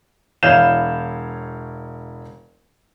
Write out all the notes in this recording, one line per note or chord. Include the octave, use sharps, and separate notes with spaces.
E1 E4 C#5 F5 G6 E7